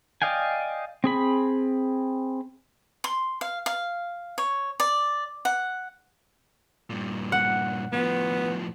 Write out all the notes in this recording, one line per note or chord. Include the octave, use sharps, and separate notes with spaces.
D5 D#5 F5 G5 G#5
C4 G#4 B5
C6
F5
F5
C#5
D5
F#5
G2 A#2
F#5
A2 F3 B3